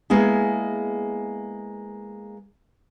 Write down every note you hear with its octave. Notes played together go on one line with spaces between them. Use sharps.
G#3 A#3 B3 E4 G#4